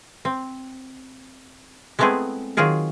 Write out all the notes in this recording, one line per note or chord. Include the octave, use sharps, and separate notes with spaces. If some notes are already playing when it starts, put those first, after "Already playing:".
C4
G#3 A3 B3 C4 E4 G#4
D#3 F#3 F4 G#4 A#4